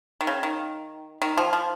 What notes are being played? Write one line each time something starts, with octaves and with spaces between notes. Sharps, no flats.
D#3
C#3
D#3
D#3
F3
F3